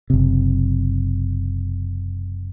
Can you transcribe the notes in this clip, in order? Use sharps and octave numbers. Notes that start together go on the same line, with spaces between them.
F#1 C3